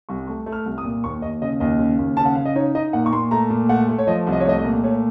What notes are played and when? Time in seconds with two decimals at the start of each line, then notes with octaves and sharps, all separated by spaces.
0.09 C2 C#6
0.27 A3 C#6
0.46 A3
0.52 F6
0.66 C2
0.78 D#6
0.84 A#2
1.04 D#2 C#6
1.22 D#2 D#5
1.42 C#3 D#5
1.60 D#2 D#5
1.79 C#3
1.99 D#2
2.17 C#3 A5
2.25 F#5
2.35 C#3 F5
2.45 D#5
2.55 D#4 C#5
2.75 D#4 D#5
2.93 A#2 F#5
3.06 C#6
3.12 A#2 C6
3.31 A3 A#5
3.50 A#2
3.69 A3 F#5
3.89 A3
3.99 C#5
4.07 F3 D#5
4.27 C2
4.32 D#5
4.40 C#5
4.45 A3 D#5
4.59 D#5
4.64 A#2
4.84 A3 C#5